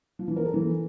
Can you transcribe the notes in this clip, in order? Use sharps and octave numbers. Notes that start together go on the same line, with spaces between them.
F3
E3
A#4
A4
E3